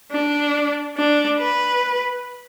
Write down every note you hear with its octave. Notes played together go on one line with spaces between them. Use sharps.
D4
D4
B4